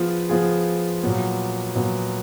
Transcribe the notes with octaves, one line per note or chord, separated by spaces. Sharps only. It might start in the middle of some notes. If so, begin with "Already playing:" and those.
Already playing: F3 B3 F4 G#4
F3 B3 F4 G#4
A#2 F#3 B3
A#2 F#3 B3